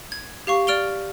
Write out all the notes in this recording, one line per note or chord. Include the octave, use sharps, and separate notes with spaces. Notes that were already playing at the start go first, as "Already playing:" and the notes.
G#6
G4 F5 C#6
D5 F6 D7 F7 G7